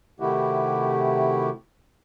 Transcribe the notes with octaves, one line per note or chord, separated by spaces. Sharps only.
C3 D#3 A3 E4 F#4 G4